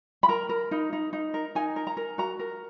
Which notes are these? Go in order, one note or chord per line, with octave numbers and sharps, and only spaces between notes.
B5
A#4 A#5
A#4
D#4
D#4
D#4
A#4
D#4 G#5
A#4
A#5
A#4
F#4 A#5
A#4